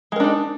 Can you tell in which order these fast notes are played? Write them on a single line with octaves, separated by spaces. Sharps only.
G#3 A#4 D4 D#4